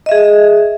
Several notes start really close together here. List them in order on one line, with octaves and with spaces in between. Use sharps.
D#5 E5 G#4